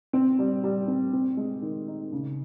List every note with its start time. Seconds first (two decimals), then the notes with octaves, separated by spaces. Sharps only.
0.13 C4
0.39 G3
0.64 G3
0.88 C4
1.13 C4
1.37 G#3
1.62 D#3
1.87 D#4
2.12 C#3